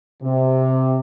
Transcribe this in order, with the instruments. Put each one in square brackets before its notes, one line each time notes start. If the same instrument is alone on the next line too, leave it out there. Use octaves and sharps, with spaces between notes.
[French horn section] C3